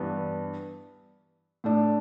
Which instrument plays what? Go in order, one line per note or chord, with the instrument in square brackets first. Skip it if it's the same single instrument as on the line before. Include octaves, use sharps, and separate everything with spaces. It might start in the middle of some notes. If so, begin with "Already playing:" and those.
Already playing: [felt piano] G2 E3 B3 D4
A2 A3 D4